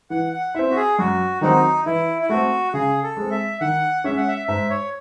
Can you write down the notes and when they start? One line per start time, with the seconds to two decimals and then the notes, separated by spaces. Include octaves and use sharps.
0.10 E3 F#5
0.33 F#5
0.54 C4 E4 E5
0.70 F#4
0.76 G#4
0.99 F#2 F#4
1.41 D#3 F#3 C4 D#4 F#4
1.85 E3 E4
2.22 E4
2.29 A3 C4 F#4
2.73 C#3 G#4
3.03 A4
3.17 G#3 C4
3.31 E5
3.61 D#3 F#5
4.04 G#3 C#4 E5
4.17 F#5
4.28 E5
4.48 G#2 E5
4.70 C#5